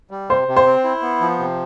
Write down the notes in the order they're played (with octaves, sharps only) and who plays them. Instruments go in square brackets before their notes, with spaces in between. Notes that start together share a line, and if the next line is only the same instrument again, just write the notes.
[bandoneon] G3
[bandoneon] C3 [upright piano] C5
[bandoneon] C3
[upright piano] C5
[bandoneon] C4
E4
B3
F3
C3